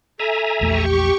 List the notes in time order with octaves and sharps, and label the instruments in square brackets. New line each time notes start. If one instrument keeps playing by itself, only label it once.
[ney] A4 [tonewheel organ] E5 G#5 A#5
[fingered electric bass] A#1 E2 A3 [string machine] G4 C#6